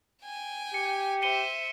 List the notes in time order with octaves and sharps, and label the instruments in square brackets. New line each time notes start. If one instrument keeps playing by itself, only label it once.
[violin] G5 G#5
[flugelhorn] G4 [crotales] C#7
[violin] C5 E5 [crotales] C#7 D#7 G7